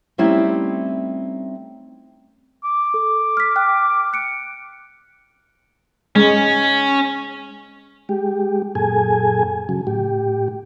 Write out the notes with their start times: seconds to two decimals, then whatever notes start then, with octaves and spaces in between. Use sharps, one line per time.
0.18 G3 A3 C4 C#4 D#4 E4
2.64 D6
2.94 A4
3.37 F6 B6
3.56 G5 F6 F#6
4.13 F#6 C#7 D7
6.16 G#3 C#4
8.09 G#3 G4
8.75 F#2 A#2 G#4 A4 G#5
9.69 C#3 F#3
9.87 A2 G4